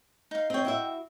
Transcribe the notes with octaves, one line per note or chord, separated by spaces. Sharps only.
D#4 F5
C4 C#5 D#5 G5
E4 F#4 E5